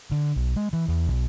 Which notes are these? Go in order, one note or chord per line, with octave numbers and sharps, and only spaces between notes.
D3
B1
G#3
E3
E2
B1